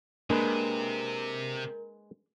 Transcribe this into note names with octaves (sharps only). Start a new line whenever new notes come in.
C3 G#3 A#3 D4 A#4 B4